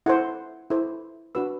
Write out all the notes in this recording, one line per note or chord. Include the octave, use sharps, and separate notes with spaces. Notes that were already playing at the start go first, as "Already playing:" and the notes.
E4 A4 C5 F#5
E4 A4 C5
D4 F#4 B4 E6